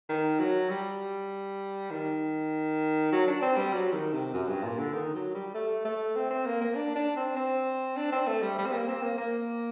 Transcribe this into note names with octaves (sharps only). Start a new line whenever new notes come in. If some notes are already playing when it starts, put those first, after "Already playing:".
D#3
F#3
G3
D#3
F#3
D4
C4
G3
F#3
D#3
C3
F#2
G2
A#2
D3
D#3
F#3
G3
A3
A3
C4
C4
A#3
A#3
D4
D4
C4
C4
D4
C4
A3
G3
G3
C4
A#3
C4
A#3
A#3